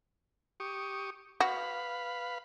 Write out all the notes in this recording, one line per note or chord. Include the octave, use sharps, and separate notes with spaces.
G4 C#6 D#6
F#4 B4 F5 B5